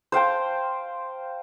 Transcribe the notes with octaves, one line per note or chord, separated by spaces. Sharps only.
C5 F5 G5 A5